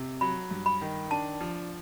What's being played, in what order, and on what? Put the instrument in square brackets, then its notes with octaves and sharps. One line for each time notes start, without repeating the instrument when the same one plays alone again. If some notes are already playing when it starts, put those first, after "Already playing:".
Already playing: [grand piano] C3
[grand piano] F#3 [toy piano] B5
[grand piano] G2
[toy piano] B5
[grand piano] D#3
[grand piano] D4 [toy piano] A5
[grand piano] F3